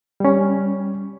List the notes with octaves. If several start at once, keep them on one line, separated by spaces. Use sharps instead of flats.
G3 C#4